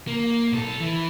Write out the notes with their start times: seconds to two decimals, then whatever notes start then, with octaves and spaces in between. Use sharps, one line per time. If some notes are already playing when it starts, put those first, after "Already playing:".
0.07 A#3
0.52 B1 A4
0.80 E3